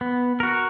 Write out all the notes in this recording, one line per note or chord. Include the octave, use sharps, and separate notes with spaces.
B3
F#4 A#4